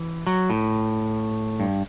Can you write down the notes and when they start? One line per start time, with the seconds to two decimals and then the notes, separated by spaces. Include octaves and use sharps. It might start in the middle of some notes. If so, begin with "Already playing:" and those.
Already playing: E3
0.27 F#3
0.50 A2
1.60 G2